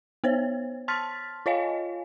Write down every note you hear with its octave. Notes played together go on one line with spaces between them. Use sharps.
B3 C5 C#5
A5 C6 F6 A6 B6
F4 C#5 D#5 F5 G#5